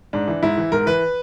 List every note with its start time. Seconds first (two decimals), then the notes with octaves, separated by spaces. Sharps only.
0.13 G#2 D4
0.28 E3
0.43 G#2 E4
0.58 E3
0.72 G#2 A#4
0.86 E3 B4